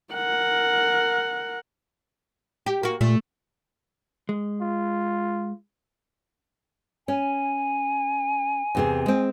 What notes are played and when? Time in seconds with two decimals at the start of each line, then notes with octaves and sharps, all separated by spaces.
0.14 A#4 F#5
2.66 G4
2.83 A#3 F#4
3.01 A#2 A3
4.29 G#3
4.61 F4
7.08 C#4 G#5
8.75 E2 C3 G#4
9.06 G#3 C4